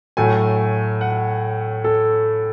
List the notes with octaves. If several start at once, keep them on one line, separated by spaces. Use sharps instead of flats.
A2 F#3 A3 G#5
F#5
A4